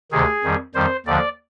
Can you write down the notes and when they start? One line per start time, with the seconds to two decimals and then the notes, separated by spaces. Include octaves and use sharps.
0.12 D2 C3 D#3 G#4
0.44 F2 D#3 G3
0.74 F2 D#3 G3 C5
1.06 D#2 D3 F3 D5